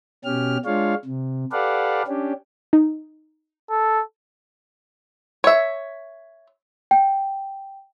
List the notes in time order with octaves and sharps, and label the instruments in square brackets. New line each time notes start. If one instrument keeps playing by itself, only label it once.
[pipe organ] B2 C#4 G4 F6
G#3 D4 F4 C#5 F5
C3
G4 A4 B4 D5 F5 F#5
C#4 D4 G4
[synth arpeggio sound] D#4
[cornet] A4
[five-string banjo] C#5 E5
[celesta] G5